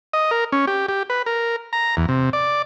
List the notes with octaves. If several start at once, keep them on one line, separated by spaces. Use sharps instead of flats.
D#5
A#4
C#4
G4
G4
B4
A#4
A#5
E2
C3
D5